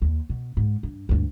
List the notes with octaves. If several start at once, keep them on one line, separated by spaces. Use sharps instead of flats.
D#2
B2
G#2
G2
D2 G2